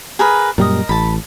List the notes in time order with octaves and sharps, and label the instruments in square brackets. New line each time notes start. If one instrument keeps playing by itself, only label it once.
[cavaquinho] G#4 A#4 B4
[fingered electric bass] F#2 A#2 G3 [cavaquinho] A#4 D#5
[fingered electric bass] A1 [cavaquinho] A5 B5